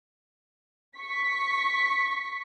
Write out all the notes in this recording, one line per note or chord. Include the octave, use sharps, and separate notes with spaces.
C#6 B6